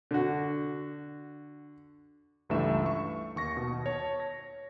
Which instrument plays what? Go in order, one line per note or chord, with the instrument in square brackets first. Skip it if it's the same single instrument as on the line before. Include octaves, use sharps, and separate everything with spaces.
[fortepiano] D3 F#4
[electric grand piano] C#2 G2 E3 A3 E5 E7
C#6
D#2 C#6 A#6
B2
C#5 A5
A#6